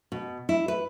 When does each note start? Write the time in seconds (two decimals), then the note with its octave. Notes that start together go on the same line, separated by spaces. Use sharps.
0.12 B2
0.49 E4
0.68 B4